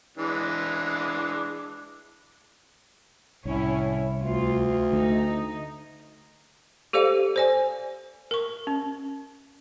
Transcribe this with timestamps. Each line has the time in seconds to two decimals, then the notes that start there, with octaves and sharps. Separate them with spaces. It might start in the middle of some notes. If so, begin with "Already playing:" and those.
0.17 E3 G#3 D4
3.45 C2 A2 C#4 E4
4.21 D2 F4
4.92 D3 A3 D#4
6.93 G4 A4 C5 D5 F5
7.36 C5 D5 G#5
8.31 A#4 C#6
8.67 C#4